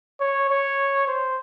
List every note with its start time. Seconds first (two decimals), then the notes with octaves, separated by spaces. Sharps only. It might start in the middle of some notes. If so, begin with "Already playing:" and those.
0.20 C#5
0.50 C#5
1.07 C5